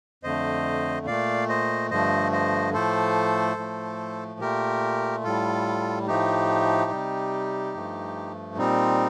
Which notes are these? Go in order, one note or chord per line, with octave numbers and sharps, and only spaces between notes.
F2 D3 A3 C5 D#5
A#2 A3 D5 F5
C5 D#5
G2 D3 F3 A3 C5 D#5
C5 D#5
A2 F3 A3 A4 C5
A2 F3 A3
A#2 A3 G4 A#4
A2 G3 F4 A4
A2 F3 A3 D#4 G4
C3 G3
G2 F3 A3
A#2 G3 C4 D#4